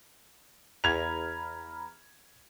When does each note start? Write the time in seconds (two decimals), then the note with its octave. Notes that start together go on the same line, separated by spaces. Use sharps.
0.84 E2 A#5 B5 F6 G#6 F7